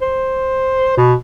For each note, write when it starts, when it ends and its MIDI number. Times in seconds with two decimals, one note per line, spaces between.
0.02 0.94 72
0.97 1.14 47